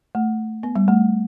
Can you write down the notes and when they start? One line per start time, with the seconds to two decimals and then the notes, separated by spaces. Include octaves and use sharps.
0.15 A3
0.63 B3
0.76 G3
0.88 A3